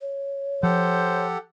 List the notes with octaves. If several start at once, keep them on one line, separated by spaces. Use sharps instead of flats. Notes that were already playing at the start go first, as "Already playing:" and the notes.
C#5
F3 G4 A4 C5 F#5